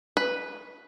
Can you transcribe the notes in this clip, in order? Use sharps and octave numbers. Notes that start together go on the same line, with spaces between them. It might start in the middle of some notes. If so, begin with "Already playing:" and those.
B4